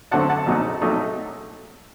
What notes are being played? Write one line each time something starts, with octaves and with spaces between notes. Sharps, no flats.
F#2 D3 A3 C4 F#5 A5
F#5 A5
A#1 A#2 F#3 A3 D#4
A#1 A#2 F#3 A3 D#4